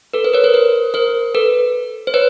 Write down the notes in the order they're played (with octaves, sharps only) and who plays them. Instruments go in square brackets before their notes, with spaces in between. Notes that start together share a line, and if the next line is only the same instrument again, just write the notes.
[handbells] A4 B4
A#4 C5
B4 C#5
A#4 C5
A#4 C5
A#4 C5
A4 B4
C5
B4 C#5